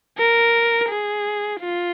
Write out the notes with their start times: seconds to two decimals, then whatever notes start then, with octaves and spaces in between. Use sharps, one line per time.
0.18 A#4
0.89 G#4
1.61 F4